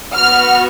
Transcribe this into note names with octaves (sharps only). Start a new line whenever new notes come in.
B3 F#4 F6